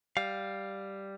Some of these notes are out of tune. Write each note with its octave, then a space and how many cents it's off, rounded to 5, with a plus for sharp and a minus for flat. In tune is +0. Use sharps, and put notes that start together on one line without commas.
G3 +0 F5 +10